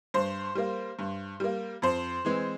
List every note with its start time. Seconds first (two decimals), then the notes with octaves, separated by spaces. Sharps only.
0.14 G2 C5
0.55 G3 A#3
0.99 G2
1.40 G3 A#3
1.82 F2 C5
2.25 E3 G#3 C4